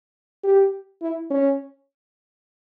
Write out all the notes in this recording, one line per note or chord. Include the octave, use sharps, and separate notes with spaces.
G4
E4
C#4